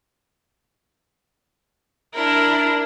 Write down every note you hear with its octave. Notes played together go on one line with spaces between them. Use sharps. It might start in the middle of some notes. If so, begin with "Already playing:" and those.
D4 E4 A#4